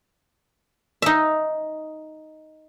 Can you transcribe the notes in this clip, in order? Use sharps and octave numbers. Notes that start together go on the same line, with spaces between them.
D#4 E5